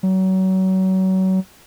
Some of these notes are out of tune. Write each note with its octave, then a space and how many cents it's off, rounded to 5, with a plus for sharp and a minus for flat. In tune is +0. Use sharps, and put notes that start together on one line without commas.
F#3 +30